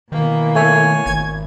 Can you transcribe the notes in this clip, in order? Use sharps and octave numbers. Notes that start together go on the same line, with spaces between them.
B2 D#3 E3 A#3
A3 C#5 G#5
G#1 G#6